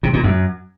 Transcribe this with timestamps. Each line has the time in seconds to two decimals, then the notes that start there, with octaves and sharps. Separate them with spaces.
0.03 C3
0.13 A#2
0.23 F#2